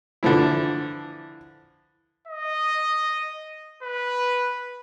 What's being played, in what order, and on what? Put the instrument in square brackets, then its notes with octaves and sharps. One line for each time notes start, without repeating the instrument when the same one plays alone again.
[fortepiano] D3 E3 F3 E4
[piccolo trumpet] D#5
B4